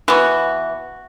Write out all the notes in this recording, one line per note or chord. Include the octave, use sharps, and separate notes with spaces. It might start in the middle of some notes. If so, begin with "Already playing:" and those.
E3 B3 F#4